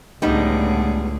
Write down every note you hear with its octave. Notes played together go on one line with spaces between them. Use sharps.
C#2 A2 D3 G3 B3 D#4 G#4